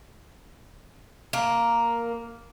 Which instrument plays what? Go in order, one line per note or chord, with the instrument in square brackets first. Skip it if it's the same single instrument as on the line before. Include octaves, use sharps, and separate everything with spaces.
[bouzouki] A#3